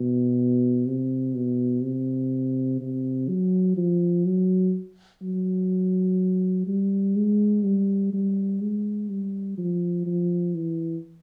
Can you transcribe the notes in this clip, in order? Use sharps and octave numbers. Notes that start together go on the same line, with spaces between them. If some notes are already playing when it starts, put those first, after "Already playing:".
Already playing: B2
C3
B2
C3
C3
F#3
F3
F#3
F#3
G3
G#3
G3
G3
G#3
G3
F3
F3
E3